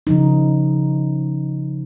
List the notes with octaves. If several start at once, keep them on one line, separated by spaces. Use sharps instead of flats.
C#3 F3 D#4